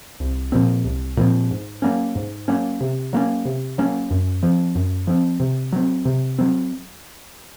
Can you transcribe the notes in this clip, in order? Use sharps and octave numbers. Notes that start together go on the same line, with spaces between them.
C2
A#2 F3 C4
C2
A#2 F3 C4
G#2
F#3 A#3 C#4
G#2
F#3 A#3 C#4
C3
F#3 A#3 C#4
C3
F#3 A#3 C#4
F#2
F3 C4
F#2
F3 C4
C3
F#3 C4
C3
F#3 C4